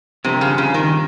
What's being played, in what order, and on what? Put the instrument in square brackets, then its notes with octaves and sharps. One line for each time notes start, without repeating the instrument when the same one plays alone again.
[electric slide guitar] G2 F3 C4 G4 A#4 [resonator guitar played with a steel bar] C3
[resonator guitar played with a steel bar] C#3
C#3
D#3